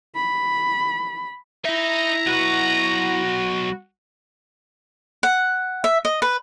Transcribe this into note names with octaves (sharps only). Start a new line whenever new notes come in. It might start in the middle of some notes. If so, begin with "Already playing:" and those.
B5
D#4 E4 E5 A#5
B1 F#4 B4
F#5
E5
D#5
B4